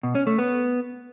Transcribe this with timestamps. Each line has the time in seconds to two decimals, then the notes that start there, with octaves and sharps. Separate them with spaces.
0.03 B2
0.15 C#4
0.27 A3
0.38 B3